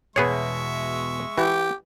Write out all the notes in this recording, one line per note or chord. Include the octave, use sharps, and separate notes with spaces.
E2 B2 G#3 B3 G#4 C#5 E5 C#6
E3 G4